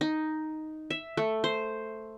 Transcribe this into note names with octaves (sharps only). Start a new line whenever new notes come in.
D#4
E5
A3
C5